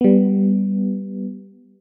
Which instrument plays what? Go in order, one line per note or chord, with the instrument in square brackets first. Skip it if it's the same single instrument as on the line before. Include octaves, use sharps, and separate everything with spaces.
[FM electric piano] G3 B3